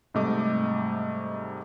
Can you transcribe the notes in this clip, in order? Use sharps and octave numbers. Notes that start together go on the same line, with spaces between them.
G#2 C3 G3 A3 D#5 D6